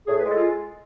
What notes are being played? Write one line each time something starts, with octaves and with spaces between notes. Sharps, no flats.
A2 G#4
B4
G#3 A4
F4